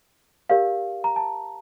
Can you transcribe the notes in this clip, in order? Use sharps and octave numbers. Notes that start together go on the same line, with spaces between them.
G4 A#4 D5 F5
A#5
A5